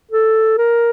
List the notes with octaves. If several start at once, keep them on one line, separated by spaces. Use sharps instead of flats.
A4
A#4